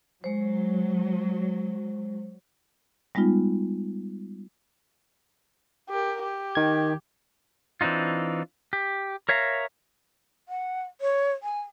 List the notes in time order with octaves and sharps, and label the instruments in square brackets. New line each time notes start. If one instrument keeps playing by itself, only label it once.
[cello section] F#3 [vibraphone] G#3 C5
[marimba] G3 G#3 B3 D#4 F4
[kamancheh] G4 A#4
G4
[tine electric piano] D#3 G#6
[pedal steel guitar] E3 C4 D4 D#4 F4
G4
A#4 C#5 E5 F5 A#5
[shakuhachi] F#5
C#5
G#5